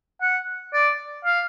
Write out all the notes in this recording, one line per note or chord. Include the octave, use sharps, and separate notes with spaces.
F#5
D5
F5